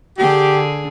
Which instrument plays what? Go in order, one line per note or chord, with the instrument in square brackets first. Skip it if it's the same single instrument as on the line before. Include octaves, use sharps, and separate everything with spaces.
[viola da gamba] D3 G#4 [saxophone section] G4